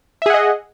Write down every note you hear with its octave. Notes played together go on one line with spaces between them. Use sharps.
G#4 D#5 E5 F#5